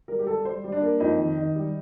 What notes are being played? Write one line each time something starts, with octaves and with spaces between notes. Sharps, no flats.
G3 A#4
G4
G3 A4
G3 C5
G3
D4
A#3
F2 D#4
D#3
D#3
G3